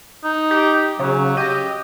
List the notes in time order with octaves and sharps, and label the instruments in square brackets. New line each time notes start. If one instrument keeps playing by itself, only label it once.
[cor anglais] D#4
[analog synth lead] G4
[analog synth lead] C#3 [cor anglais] F#3
[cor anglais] G4 [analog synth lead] D#5